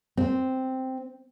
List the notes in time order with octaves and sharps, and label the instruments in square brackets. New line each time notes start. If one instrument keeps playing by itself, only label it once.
[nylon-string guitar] C4